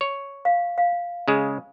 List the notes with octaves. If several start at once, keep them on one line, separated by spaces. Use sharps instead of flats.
C#5
F5
F5
C#3 G#3